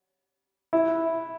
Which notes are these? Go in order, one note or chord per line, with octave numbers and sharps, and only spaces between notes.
E4